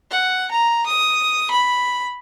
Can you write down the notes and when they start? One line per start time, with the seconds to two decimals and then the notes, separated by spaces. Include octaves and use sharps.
0.11 F#5
0.51 A#5
0.87 D#6
1.51 B5